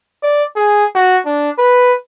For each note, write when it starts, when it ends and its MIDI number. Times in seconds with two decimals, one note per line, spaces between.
0.23 0.44 74
0.56 0.85 68
0.95 1.18 66
1.26 1.50 62
1.59 1.94 71